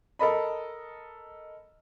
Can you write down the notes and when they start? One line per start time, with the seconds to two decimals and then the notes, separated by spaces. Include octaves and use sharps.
0.19 A4 A#4 D#5 B5